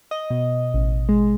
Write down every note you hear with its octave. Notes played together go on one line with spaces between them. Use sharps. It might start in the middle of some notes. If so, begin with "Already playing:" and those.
D#5
B2
A1
G#3